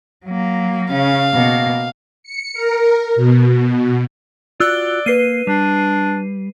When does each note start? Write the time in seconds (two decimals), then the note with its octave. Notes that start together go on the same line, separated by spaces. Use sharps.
0.25 F#3 A#3
0.92 C#3 C#4 F5
1.32 B2 A#3
2.23 C#7
2.53 A#4
3.16 B2
4.60 F4 F#4 D5 E6 F#6 G7
5.06 A#3 B4 C7 D#7
5.47 G3 D4